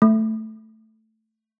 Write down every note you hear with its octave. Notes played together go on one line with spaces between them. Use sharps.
A3